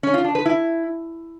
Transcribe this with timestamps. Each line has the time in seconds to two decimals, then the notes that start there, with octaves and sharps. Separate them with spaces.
0.03 C#4
0.14 F4
0.24 D4
0.35 B4
0.46 E4